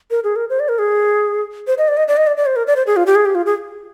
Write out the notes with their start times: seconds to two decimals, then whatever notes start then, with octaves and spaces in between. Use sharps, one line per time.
0.11 A#4
0.24 G#4
0.36 A#4
0.50 C5
0.60 D5
0.69 A#4
0.79 G#4
1.67 C5
1.78 D#5
1.88 D5
1.97 D#5
2.08 D5
2.17 D#5
2.27 D5
2.37 D5
2.46 C5
2.56 A#4
2.67 D5
2.76 C5
2.87 G#4
2.96 F4
3.06 G4
3.15 G#4
3.26 G4
3.35 F4
3.46 G#4